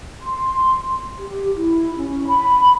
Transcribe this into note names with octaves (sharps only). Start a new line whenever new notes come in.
C6
G4
E4
C#4
B5